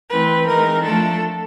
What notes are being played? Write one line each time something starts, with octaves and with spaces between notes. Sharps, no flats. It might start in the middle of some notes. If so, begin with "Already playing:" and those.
E3 A3 C4 B4
E3 G#3 C4 D#4 A#4
F3 A3 D4 A4